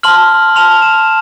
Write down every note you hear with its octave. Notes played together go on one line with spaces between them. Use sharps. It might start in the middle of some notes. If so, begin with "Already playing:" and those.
A5 C6 F6 F#7
A5 C6 F6 F7
E7